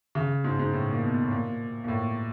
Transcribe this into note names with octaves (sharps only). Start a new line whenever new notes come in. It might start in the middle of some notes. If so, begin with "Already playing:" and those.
C#3
G#2
G#2
A2
A#2
B2
A2
A#2
A#2
A2